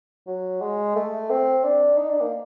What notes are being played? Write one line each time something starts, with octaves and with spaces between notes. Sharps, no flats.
F#3
G#3
A3
C4
D4
D#4
D4
A#3